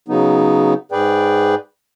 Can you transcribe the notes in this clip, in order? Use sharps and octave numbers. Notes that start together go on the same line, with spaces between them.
C#3 F#3 B3 D#4
G#2 G#4 B4 D5 G5